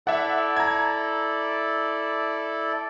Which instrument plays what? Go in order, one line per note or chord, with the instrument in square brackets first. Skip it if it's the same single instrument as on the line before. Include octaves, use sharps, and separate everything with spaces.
[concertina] E4 A4 D5 [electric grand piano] E5 F#5
[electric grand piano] A#5 G#6